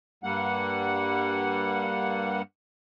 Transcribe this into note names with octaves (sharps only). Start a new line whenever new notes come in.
G2 G3 A#3 F#5